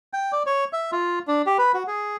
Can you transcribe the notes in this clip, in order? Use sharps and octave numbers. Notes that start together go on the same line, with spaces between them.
G5
D5
C#5
E5
F4
D4
G4
B4
F#4
G#4